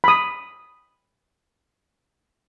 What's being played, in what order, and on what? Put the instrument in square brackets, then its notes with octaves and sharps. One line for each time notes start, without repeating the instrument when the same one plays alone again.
[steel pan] B5 D#6